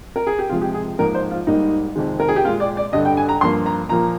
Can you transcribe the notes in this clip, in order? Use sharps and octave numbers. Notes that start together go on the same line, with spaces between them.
A#4
G#4
G4
C3 F3 G#3 F4
G4
G#4
G#2 F3 A#3 A#4
C5
F4
G#2 G3 A#3 D#4
F2 C3 D#3 G#3
A#4
G#4
G4
A#2 G#3 F4
D5
D5
G2 D3 G3 D#5
G5
G#5
A#5
G2 F3 A#3 C6
A#5
A#2 F3 A#3 A#5